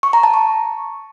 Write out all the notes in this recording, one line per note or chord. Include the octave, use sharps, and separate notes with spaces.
C#6
A#5
A5
C#6